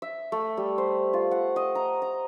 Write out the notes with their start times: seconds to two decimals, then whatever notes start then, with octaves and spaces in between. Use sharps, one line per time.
0.02 E5
0.32 A3
0.57 G3
0.78 C5
1.13 F4
1.31 F#5
1.56 D#5
1.75 A#5
2.02 A#5